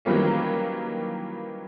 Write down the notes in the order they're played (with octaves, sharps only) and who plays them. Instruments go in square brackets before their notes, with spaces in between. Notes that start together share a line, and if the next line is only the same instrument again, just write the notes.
[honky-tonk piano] D#3 E3 F#3 G3 A#3 C#4